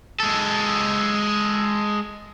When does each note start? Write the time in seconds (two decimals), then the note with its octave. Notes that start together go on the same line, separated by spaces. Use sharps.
0.20 G#3 A4